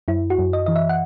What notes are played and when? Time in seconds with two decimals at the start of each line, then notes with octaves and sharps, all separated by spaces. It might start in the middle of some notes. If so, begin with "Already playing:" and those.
0.08 F#2 E4
0.30 F#4
0.39 F#2
0.53 D#5
0.66 E3 D#5
0.76 E5
0.89 F#5